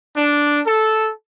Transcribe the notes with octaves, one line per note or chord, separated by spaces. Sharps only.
D4
A4